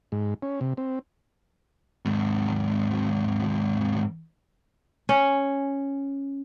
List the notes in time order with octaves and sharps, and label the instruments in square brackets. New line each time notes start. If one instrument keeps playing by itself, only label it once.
[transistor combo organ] G#2
C#4
C3
C4
[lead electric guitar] D#2 G#2
[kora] C#4